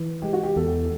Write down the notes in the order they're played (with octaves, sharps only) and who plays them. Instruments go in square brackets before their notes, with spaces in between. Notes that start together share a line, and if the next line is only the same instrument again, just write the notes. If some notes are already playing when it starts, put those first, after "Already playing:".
Already playing: [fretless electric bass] E3
[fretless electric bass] G#3 [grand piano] G4
[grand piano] F#4
G4
[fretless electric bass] E2 [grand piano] A4